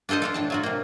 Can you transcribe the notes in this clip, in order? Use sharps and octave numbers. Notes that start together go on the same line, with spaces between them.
D4 F4 A4 C5 D#5
D4 F4 A4
A2 D4 A5
F#3 F4 F#4
C3 A#3